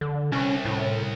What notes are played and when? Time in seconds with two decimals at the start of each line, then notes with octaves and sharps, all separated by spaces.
0.01 D3
0.32 C2 C#4
0.65 A2